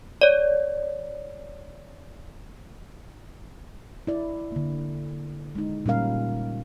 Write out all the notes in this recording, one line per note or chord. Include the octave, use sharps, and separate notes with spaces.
C#5 D5
E4 D5
D3 A#3
G#3 D#4
A#2 G3 C#4 A#4 F5